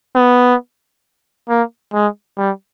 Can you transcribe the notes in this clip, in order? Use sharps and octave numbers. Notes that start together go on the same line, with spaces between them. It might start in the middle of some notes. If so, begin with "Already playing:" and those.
B3
A#3
G#3
G3